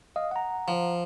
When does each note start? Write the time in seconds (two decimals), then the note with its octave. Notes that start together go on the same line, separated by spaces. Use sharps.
0.16 D#5 F5 D#6
0.31 F#5 A#5
0.68 F3